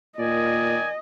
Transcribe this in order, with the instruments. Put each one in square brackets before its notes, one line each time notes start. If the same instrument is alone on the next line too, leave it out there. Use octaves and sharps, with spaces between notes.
[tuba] A#2 [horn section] D#3 D5 G#5 [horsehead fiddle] D#5